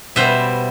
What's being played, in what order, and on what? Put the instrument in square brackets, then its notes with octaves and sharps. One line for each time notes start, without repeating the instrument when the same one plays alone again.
[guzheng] B2 G3 B3 C5 E5